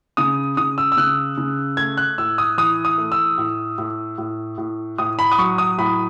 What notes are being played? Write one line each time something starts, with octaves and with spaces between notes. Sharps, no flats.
C#3 D#6
C#3 D#6
E6
E6
C#3 F#6
C#3
A3 G#6
F#6
A2 E6
D#6
E3 D#6
D#6
A3
E6
A2
A2
A2
A2
A2 D#6
B5
D#6
F#3 C#6
D#6
A2 B5